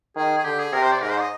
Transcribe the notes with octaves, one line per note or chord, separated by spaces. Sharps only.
D#3 G#4
G#4
D3 G4
G#4
C3 A#4
C5
D5
G#2 A#4
C5
D#5